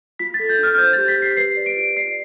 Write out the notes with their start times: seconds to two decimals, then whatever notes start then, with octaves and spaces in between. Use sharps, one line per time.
0.19 F4 B6
0.34 A6
0.40 A4
0.49 G6
0.59 D4 F6
0.78 C5 G6
0.93 G4 A6
1.08 B6
1.17 G4
1.22 C7
1.37 B4 C7
1.57 D5
1.66 D7
1.77 F4
1.96 D5 C7